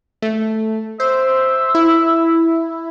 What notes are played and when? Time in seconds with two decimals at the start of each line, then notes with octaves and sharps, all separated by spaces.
0.22 A3
1.00 C5 E5
1.75 E4